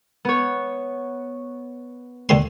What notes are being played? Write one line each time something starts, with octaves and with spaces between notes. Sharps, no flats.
B3 C#5
D#2 D3 C6